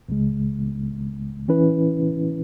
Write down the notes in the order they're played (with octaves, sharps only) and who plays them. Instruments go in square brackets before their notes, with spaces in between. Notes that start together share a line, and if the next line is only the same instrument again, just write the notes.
[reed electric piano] C#2 C#3 G#3
E3 C#4 E4 B4